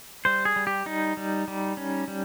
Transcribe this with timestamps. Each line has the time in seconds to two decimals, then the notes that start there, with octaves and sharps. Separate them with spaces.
0.25 G3 C5
0.45 G#4
0.56 G3
0.67 G4
0.86 G3 D#4
1.17 G3
1.48 G3
1.77 C#4
2.08 G3